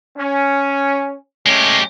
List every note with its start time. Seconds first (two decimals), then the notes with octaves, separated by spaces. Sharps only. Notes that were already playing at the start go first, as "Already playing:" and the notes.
0.17 C#4
1.46 G#3 A3 C#4 G4